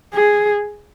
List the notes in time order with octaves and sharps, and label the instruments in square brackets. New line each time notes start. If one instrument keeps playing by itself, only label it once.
[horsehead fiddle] G#4